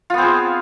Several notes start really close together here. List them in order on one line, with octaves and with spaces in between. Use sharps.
F4 B3 C4 G#4